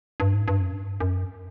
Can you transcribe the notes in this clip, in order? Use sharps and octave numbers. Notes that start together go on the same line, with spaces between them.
G2
G#2
G2
F#2
G2
F#2